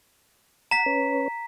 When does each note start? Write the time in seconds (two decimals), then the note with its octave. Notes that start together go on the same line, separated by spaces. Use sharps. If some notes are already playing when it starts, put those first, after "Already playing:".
0.71 F#5 A#5 B6
0.86 C#4 B4 C#5